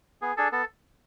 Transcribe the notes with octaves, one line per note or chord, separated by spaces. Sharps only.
B3 G#4
D4 G#4 A4
B3 A4